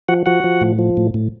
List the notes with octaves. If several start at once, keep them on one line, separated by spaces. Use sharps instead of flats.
F3 F#4 F#5
F3 F#4 F#5
F3
A2
F3
A2
A2